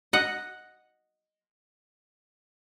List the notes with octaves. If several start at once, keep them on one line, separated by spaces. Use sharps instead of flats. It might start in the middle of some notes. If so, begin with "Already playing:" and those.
D#5 F#5